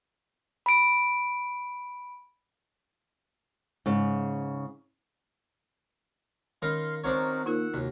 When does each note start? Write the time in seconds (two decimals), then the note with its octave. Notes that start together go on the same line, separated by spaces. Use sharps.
0.66 B5 D7
3.86 G#2 C#3
6.62 D#3 C#4 D#4 A#4 F5 C6
7.04 C4 D4 D#4 F#4 A#4 C5 C#5
7.46 A#3 D#4 F4 A#4 F#5 E6
7.74 D#2 C3 F#4